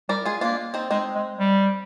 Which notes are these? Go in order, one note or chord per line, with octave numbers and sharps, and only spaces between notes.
G3 A#4 D5
G#3 F4 G#4
A#3 D4 F4
C4 D#4
G#3 C4 D#4
G#3
G3